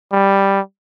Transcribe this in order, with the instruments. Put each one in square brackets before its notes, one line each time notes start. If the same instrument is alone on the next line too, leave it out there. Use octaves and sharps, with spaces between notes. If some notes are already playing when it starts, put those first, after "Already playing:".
[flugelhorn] G3